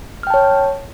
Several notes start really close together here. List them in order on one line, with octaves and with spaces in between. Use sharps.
F6 G5 A5 C#5